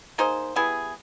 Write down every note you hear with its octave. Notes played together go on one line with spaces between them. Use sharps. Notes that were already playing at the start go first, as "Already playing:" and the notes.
A#3 D#4 G#4 C5
G3 B3 E4 G#4